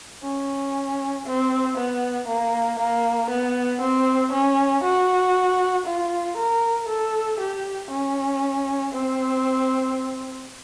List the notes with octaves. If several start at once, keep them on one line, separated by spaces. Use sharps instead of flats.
C#4
C4
B3
A#3
A#3
B3
C4
C#4
F#4
F4
A#4
A4
G4
C#4
C4